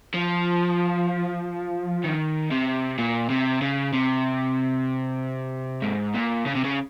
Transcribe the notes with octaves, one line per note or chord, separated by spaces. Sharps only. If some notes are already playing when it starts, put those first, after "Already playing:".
F3
D#3
C3
A#2
C3
C#3
C3
G#2
A#2
C#3
C3
C#3